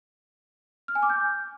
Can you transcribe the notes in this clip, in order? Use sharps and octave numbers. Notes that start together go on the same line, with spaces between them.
F6
G#5
D6
G6